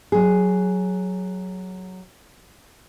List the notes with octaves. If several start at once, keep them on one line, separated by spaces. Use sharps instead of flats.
F#3 G#4